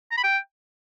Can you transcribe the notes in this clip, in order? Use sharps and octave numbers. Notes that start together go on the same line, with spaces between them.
A#5
B5
G5